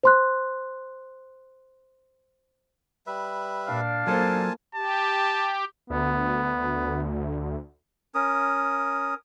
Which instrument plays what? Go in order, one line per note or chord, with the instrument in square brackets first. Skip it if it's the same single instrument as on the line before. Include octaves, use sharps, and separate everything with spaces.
[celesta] C5 C6 F#6
[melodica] G3 B4 E5
[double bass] A#2 [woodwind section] D4 D5 F5
[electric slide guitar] F#3 A4 C5 [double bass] A#3 [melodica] F4 G#5 A5
[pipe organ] G4 [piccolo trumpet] A5
[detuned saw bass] D2 [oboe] B3
[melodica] C#4 A#4 D#6